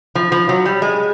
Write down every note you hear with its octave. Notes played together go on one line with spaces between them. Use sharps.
F3
F3
F#3
G3
G#3